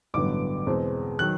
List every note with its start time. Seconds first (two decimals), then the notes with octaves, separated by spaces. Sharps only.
0.14 A1 G2 D3 F#3 B3 D6
0.67 E2 B2 G#3 C4
1.19 D#3 F#3 F#6